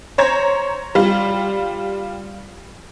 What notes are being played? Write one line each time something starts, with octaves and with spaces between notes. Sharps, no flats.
C5 C#5 A#5 G#6
G3 F4